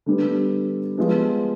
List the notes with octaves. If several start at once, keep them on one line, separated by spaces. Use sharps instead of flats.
D3 G3 B3
F3 G#3 B3